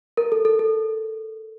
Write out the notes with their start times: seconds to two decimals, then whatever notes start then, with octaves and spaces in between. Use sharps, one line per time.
0.17 A#4
0.32 A4
0.45 A4
0.59 A4